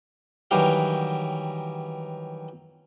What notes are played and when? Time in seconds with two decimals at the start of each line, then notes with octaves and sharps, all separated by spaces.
0.51 D#3 E3 F#3 G3 G4 F5